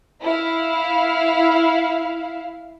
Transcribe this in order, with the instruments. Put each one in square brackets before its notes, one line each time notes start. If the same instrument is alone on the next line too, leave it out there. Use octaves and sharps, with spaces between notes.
[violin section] E4 F5